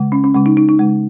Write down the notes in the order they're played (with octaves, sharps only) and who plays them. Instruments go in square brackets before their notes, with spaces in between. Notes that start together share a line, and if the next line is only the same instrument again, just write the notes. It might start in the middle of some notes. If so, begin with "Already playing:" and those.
Already playing: [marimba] C#3 G#3
C#4
C#4
C#3 G#3 C#4
D#4
D#4
D#4
C#3 G#3